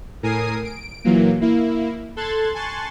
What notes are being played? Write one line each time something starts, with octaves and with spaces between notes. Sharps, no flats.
A2 A#4 G#5 D#6 C7 D#7
D7
A#2 E3 F#3 A#3
A#3 E4
A4 C6 F#6 G#6 A6
G#5 A5 C6 C#6 F#6 A6